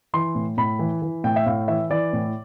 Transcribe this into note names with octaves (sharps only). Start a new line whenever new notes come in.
E3 C6
A2
A2 B5
E3
E3
A2 G5
E5
A2 F5
E3 E5
E3 D5
A2